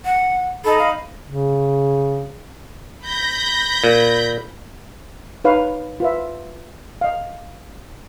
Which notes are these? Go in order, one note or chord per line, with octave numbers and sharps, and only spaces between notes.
F#5
D#4 A4 A#5 B5
F5
C#3
B5 G6 A#6
A#2
D#4 B4 C#5 F5
F4 B4 E5
D#5 F5